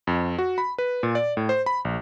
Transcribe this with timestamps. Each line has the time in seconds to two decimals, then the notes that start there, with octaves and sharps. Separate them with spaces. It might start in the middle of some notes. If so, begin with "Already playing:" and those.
0.07 F2
0.38 F#4
0.58 B5
0.78 B4
1.03 A#2
1.15 D5
1.37 A2
1.49 C5
1.66 B5
1.85 A#1